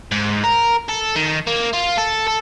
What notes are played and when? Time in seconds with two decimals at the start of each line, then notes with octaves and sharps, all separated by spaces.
0.12 G#2
0.44 A#4
0.89 A4
1.16 D#3
1.47 A#3
1.73 F4
1.98 A4
2.28 A4